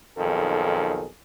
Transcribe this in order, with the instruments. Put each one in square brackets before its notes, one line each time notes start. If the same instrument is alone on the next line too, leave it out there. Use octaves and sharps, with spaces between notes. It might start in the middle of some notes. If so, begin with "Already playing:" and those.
[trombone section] B1 F2 D#3 G#4 A4